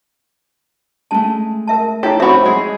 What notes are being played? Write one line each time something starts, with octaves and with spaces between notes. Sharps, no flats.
G#3 A3 C#4 A5
A#4 E5 A5
D#4 E4 G4 A4 C#5 G6
C4 F#4 E5 B5
G#3 G#5